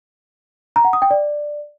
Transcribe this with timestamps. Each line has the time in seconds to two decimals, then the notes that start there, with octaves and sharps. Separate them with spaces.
0.76 A#5
0.85 F#5
0.93 D#6
1.02 G5
1.11 D5